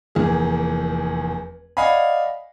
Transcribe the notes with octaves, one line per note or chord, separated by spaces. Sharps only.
F1 E2 A#3 G#4
D5 D#5 F5 F#5 G#5 B5